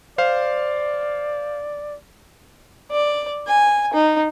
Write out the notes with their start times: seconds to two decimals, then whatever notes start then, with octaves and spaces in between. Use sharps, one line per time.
0.18 C5 D5 F5
2.92 D5
3.47 G#5
3.93 D#4